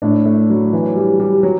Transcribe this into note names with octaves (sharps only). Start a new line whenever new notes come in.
A2 D4
A3
F#3
E3
G3
G3
F#3